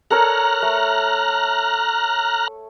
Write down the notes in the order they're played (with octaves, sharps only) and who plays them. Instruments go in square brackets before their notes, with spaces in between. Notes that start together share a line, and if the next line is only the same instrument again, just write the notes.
[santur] A4 A#4 C#5 [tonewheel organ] A#5 F6 F#6
[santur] A3